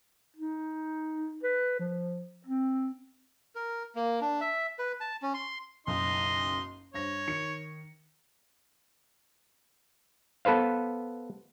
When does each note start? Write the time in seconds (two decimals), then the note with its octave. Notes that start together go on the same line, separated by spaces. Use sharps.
0.36 D#4
1.43 B4
1.79 F3
2.46 C4
3.55 A#4
3.95 A#3
4.21 D4
4.41 E5
4.79 B4
5.01 A5
5.22 C#4
5.34 C6
5.87 F#1 B1 F#2 D#4 C6
6.94 G2 C5 C#5 A#6
7.28 D#3 C#7
10.45 B3 A4 B4 C5 F5